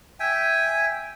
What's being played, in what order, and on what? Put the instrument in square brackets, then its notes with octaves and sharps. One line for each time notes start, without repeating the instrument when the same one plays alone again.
[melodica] E5 G5 G#5